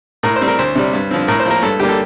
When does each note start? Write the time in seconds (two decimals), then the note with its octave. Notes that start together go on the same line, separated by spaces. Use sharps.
0.23 A2 A#4
0.36 C5
0.41 G3 C4
0.48 A#4
0.59 D2 C5
0.75 C3 G3
0.93 G2
1.11 D3 F3 C4
1.28 A2 A#4
1.40 C5
1.46 F3 A#3 A#4
1.62 G2 A4
1.79 D3 G3 A#3 G4
1.89 A4